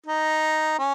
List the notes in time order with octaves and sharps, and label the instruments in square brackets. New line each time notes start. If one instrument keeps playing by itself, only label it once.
[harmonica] D#4
C#4